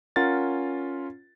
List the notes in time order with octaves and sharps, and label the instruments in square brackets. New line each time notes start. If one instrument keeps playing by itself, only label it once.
[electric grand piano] C#4 F4 A#4 F#5 A6